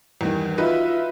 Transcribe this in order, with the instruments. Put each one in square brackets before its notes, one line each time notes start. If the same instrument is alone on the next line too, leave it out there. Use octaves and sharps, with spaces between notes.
[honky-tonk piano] E2 G2 D#3
[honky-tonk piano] D#4 F#4 B4 [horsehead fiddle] F4 E5